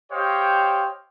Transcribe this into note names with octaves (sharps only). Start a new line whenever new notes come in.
G4 C5 C#5 D#5 F5 G5